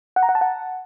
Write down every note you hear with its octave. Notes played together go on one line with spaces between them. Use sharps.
F#5
A#5
F#5
A5
F#5